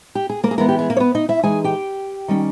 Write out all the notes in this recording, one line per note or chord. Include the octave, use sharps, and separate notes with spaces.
G4
G#4
A#3 A#4
G#4
E3 G#3 A#3 B3 A#4
G4
G#4
A#3 A#4
C#5
B3 B4
D#4 D#5
E4 E5
E3 G#3 D#4 G#4 G#5
G4 G5
D#3 G3 C#4